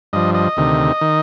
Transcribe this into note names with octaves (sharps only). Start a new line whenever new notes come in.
G2 F3 D#5
D#5
D2 C3 D#3
D#3